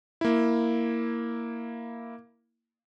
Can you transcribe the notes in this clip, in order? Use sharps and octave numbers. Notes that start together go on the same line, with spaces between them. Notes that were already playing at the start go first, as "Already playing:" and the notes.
A#3 E4